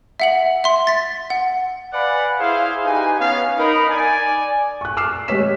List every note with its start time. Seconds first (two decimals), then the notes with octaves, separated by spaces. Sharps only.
0.20 E5 F#5 F#7
0.64 E5 C6
0.87 A6 B6
1.30 F#5
1.93 B4 D5 F5 F#5 G#5 B5
2.40 E4 G#4 C5 F5
2.85 D#4 G4 B4 G#5
3.19 B3 C#4 F5
3.58 D#4 A#4 B5
3.89 D5 G#5
4.81 C#6 F#6
4.97 D6 E6 F6 C7 E7
5.28 G#3 G4 C#5 B6 E7